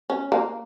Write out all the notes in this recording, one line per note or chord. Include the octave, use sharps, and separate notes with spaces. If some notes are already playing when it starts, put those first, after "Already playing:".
C#4
A#3